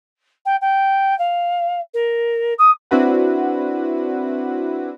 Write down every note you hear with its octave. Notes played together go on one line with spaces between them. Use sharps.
G5
G5
F5
A#4
D#6
C4 D4 E4 F#4 B4 F#5